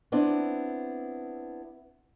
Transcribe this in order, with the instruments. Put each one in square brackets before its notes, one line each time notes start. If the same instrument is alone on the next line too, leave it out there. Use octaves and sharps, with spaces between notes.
[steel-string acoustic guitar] B3 C4 D4 E4